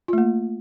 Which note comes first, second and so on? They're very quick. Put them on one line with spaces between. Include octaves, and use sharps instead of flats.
F4 A3 A#3